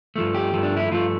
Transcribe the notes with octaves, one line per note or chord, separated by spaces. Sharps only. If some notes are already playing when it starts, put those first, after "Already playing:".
G2 F3 A3
G4
G2 F3 A3
D4
E4
G2 F3 A3 F4